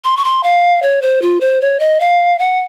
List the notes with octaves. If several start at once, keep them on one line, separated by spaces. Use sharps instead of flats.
C6
C#6
C6
F5
C#5
C5
F4
C5
C#5
D#5
F5
F#5